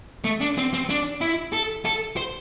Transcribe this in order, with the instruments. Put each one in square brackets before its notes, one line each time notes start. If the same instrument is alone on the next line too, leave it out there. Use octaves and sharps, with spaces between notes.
[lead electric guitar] A3
D4
C4
C4
D4
E4
A4
A4
C5